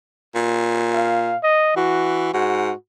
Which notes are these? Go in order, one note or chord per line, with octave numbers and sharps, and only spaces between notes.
A#2
F5
D#5
E3 F#4
G#2 F#4